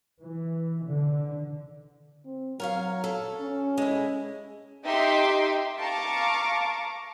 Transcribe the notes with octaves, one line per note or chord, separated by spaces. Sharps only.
E3
D3
C4
F#3 A#4 C#5 F5
A4
C#4
G#3 E4
D#4 G4 E5 G5 C6 D6
F5 A5 A#5 C#6 D6